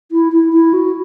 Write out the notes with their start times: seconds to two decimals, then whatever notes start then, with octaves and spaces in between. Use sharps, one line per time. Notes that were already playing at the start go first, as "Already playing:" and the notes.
0.12 E4
0.32 E4
0.53 E4
0.73 F#4